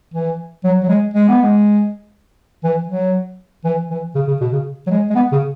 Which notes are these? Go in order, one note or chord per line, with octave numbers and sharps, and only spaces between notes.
E3
F#3
F#3
G#3
G#3
B3
G#3
E3
F#3
E3
E3
C#3
C#3
B2
C#3
F#3
G#3
G#3
B3
C#3